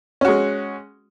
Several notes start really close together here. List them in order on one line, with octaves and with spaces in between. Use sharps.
C#4 F#4 G#3